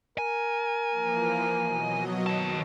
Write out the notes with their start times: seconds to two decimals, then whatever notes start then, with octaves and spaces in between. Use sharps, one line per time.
0.18 A#4 G#5
0.91 E3 F3 A#3
1.62 B2 F#3 D#5
2.26 D#3 F#4 A5